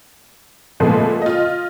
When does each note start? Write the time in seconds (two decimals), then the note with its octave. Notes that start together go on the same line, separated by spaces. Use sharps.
0.80 A#2 F3 G#3 A3 B3
1.22 F4 D#5